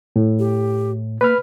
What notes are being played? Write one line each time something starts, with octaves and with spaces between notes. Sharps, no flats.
A2
G4
A#3 B4 B5 F6